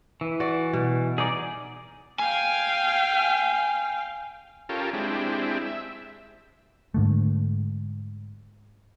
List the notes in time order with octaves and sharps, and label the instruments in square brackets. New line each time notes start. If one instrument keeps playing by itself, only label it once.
[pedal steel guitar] E3
[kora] F#4 D5
B2
[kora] D#4 [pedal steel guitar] G#4 D5
[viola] F5 G5 [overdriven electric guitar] G#5
[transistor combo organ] C#4 F4 G4 A4 A#4
G#3 C4 D4 E4 G4
E5
[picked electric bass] G#2 D3 A3